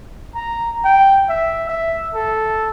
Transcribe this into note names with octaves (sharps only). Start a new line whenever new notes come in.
A#5
G5
E5
E5
A4